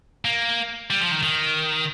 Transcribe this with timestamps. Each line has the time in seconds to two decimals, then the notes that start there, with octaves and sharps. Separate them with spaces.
0.25 A#3
0.90 G3
1.01 F3
1.12 D#3
1.23 D#3